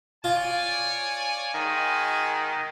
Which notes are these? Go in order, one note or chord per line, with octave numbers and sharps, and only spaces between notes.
F4 C#5 D5 G#5
D#3 G#3 F#4 G#5